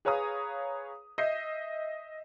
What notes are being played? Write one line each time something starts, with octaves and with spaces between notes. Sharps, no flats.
G#4 B4 C#5 F5 A#5 D#6
D#5 E5 G6 C7